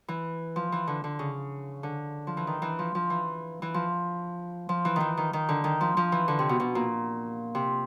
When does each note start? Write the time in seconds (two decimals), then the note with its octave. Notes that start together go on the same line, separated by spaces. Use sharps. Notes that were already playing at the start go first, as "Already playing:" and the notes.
0.08 E3
0.56 F3
0.72 E3
0.87 D3
1.04 D3
1.19 C#3
1.83 D3
2.27 F3
2.37 E3
2.47 D#3
2.62 E3
2.79 F3
2.95 F3
3.10 E3
3.62 E3
3.74 F3
4.69 F3
4.85 E3
4.96 D#3 E3
5.17 D#3
5.33 D#3
5.49 D3
5.64 D#3
5.81 F3
5.97 F3
6.12 E3
6.28 D3
6.39 C3
6.49 B2
6.60 B2
6.75 A#2
7.55 C3